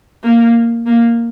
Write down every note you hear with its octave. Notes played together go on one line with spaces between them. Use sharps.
A#3
A#3